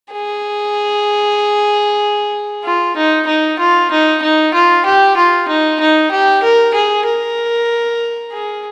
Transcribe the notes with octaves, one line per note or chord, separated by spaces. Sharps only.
G#4
F4
D#4
D#4
F4
D#4
D#4
F4
G4
F4
D#4
D#4
G4
A#4
G#4
A#4
G#4